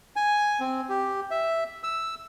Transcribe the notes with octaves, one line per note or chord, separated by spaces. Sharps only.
G#5
C4
G4
E5
E6